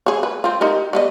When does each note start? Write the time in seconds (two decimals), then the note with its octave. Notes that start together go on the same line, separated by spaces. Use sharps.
0.06 G#4 C#5
0.23 B4
0.44 C4 F4
0.61 D#4 G4 A#4
0.93 G3 B3 D#5